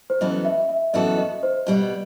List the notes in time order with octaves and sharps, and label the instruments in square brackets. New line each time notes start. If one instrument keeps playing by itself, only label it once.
[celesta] C5
[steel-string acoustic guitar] F#2 E3 B3 F#4 A4 [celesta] D#5
[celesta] E5
E5
[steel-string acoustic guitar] F#2 E3 B3 F#4 A4 [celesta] D#5
[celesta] D#5
C5
[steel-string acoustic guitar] B2 G3 B3 [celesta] D#5